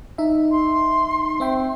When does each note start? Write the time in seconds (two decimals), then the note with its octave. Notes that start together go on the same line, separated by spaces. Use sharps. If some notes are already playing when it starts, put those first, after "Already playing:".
0.18 D#4 E5
0.51 C6
1.40 C4 E5 G5